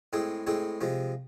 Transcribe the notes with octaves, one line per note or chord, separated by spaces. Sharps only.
A2 G#3 C4 G#4
A2 G#3 C4 G#4
C3 F3 G#3